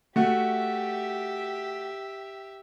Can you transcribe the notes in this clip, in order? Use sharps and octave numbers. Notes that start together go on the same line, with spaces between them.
A3 F#4 G4 E5